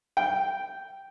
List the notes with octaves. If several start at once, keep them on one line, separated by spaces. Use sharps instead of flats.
G5